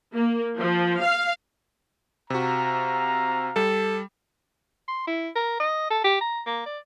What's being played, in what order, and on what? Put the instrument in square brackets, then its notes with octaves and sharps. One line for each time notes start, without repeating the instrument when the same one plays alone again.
[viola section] A#3
F3
F5
[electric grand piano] C3 F#4 [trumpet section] F5 A#5
[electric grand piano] G3 [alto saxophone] A4
[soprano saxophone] C6
E4
A#4
D#5
A4
G4
A#5
A#3
D5